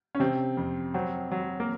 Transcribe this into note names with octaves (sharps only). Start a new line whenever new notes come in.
C#4
C3 C4
F2
F#3 C4
F#3
A#3